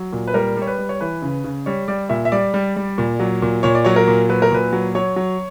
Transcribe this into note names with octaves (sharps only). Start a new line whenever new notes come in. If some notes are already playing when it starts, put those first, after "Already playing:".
Already playing: F#3
A#2
B4
G3 A#4
G3 C#5
B4
G3
C#5
E3 B4
C#3
C#3
G3 C#5
G3 D5
A#2 E5
E5
G3 D5
G3
G3
A#2
F#3
A#2
A#2 C#5
D5
F#3 C#5
A#4
A#2
F#3 B4
A#4
A#2 B4
F#3
F#3 C#5
F#3